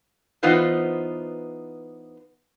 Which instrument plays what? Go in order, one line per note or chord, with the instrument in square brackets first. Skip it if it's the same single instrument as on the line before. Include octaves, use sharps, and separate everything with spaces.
[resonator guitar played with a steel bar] E3 B3 D#4 F4 B4 C5